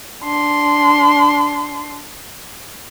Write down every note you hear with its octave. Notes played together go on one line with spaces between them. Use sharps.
D4 C6